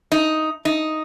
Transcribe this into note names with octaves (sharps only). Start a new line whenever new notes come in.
D#4
D#4